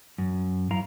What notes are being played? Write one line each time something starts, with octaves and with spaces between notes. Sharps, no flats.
F#2
F#2 E4 F5 A#5